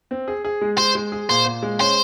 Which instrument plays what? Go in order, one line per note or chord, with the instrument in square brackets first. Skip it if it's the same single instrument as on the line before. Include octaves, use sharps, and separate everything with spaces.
[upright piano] C4
G#4
G#4
G#3
[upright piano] G#3 [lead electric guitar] C5
[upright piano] G#3
G#4
[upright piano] A#2 [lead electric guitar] C5
[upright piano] A#2
G#3
[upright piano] C#4 [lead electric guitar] C5